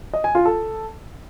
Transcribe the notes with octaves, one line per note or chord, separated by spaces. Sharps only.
D#5
G#5
F4
A4